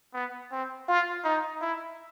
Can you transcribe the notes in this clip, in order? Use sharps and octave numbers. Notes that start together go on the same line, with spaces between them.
B3
C4
F4
D#4
E4